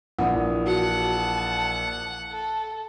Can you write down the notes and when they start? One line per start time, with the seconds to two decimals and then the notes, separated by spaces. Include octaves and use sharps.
0.18 A#1 E3 F#5 D#6
0.67 F#4 F#5 A5
2.31 A4